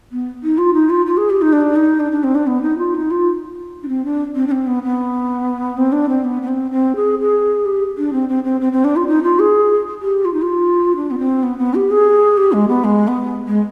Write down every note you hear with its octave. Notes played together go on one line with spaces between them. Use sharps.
B3
D#4
F4
D#4
F4
F4
G#4
G4
D#4
D4
D#4
D4
D4
C4
D4
B3
D#4
F4
D#4
F4
D4
C4
D4
C4
D4
C4
B3
B3
C4
D4
C4
B3
B3
C4
C4
G#4
G#4
G4
D4
C4
C4
C4
C4
C4
D4
F4
D#4
F4
G#4
G4
F4
D#4
F4
D4
B3
C4
B3
B3
G4
G#4
G4
G#3
B3
G#3
B3
G#3